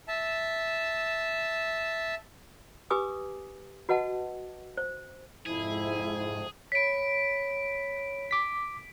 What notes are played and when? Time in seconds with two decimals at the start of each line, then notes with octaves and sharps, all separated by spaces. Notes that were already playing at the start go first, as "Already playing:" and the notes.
0.08 E5 A5
2.90 G4 B4 G#5 D6 D#6
3.89 F#4 B4 D#5 F#5 A5
4.77 C5
5.46 F2 G#2 C3 F3 E4 G#4
6.72 C#5 B5 B6 D7
8.31 D6 B6